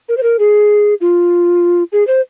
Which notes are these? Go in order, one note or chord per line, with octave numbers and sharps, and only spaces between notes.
A#4
C5
A#4
G#4
F4
G#4
C5